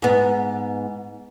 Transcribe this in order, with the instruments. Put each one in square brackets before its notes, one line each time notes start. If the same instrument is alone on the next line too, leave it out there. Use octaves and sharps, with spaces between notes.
[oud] G#2 B3